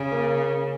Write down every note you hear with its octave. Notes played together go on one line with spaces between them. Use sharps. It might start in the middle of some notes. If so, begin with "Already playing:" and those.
Already playing: C#3
A#3